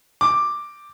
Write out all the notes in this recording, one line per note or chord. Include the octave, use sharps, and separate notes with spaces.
D6